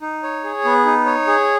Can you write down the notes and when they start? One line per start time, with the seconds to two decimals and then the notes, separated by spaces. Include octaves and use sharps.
0.02 D#4
0.23 C#5
0.44 G#4
0.65 B3
0.86 D#4
1.06 C#5
1.27 G#4